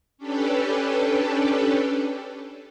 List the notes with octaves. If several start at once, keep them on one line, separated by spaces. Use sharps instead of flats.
C#4 D4 G4 A4 B4